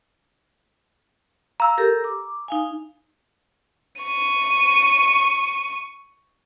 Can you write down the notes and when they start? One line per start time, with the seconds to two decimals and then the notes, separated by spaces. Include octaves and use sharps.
1.60 F5 A#5 E6
1.78 G4 A4 A#4
2.04 D6
2.48 D#4 F5 G#5
4.02 C#6 D#7